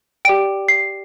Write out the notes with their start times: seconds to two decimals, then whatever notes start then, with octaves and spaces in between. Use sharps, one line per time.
0.25 G4 D5 G5 D7
0.68 C7